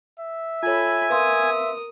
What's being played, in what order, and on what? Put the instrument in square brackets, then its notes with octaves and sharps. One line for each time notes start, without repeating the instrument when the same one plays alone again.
[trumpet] E5
[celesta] F4 C#5 [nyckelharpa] A4 B5 [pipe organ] G#5
[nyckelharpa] A#4 D#6 [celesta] B4 F5 C6